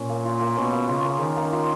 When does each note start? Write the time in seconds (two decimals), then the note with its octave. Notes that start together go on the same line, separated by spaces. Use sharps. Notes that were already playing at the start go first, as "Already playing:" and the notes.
Already playing: A#2 C#4
0.09 A#3
0.25 F4
0.41 A#3
0.57 B2 C#4
0.73 A#3
0.88 C#3 F4
1.04 A#3
1.20 D#3 C#4
1.36 A#3
1.53 F4